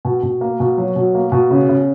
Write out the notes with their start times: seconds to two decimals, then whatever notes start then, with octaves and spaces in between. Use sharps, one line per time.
0.05 B2
0.23 B2
0.41 A#3
0.60 B2
0.77 F#3
0.96 B2
1.15 A#3
1.32 B2
1.51 C#3
1.69 C#3